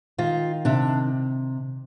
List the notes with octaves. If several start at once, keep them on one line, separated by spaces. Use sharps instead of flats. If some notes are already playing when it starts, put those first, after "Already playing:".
D#3 F4
C3 D4